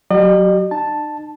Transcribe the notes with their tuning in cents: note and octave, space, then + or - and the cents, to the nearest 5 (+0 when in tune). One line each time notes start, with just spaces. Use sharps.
F#3 +0 G4 -40 D#5 -45
D#4 -40 A5 +0